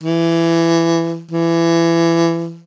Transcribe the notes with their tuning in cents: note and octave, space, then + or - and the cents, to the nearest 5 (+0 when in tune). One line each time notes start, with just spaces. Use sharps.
E3 +20
E3 +25